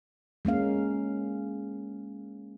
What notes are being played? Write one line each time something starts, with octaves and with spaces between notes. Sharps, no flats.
G#3 A#3 C#4 F5